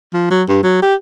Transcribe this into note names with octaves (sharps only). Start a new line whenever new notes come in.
F3
F#3
G2
F#3
G4